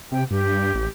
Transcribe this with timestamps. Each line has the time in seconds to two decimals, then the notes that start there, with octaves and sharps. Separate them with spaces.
0.12 C3 G5
0.31 G2 G4
0.74 A1